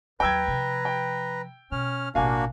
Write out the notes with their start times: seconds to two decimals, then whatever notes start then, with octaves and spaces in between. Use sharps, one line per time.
0.20 D#2 F#3 B4 G5 A#5 E6 G#6
0.48 C3 F3
0.85 G5
1.72 B2 C#4 F6
2.15 A1 B2 A#3 D4 F#4 F5 G#5